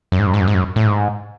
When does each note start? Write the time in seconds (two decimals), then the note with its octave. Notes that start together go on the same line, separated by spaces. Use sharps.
0.12 F#2
0.19 G#2
0.27 F#2
0.34 G#2
0.40 F#2
0.48 G#2
0.54 F#2
0.76 A2
0.86 G#2